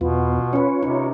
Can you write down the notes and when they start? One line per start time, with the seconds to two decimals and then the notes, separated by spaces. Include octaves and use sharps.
0.01 E2 B2 B3 F4
0.53 C#4 F4 B4 C#5
0.82 C3 D#4